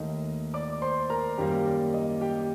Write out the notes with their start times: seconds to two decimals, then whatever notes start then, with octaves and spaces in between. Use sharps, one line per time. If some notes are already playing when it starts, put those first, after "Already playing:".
Already playing: D#2 D#3 A3 D#5
0.54 D5 D6
0.82 C5 C6
1.10 A#4 A#5
1.38 F#2 D#3 G3 A#3 G4 G5
1.66 D5
1.94 D#5
2.21 G4 G5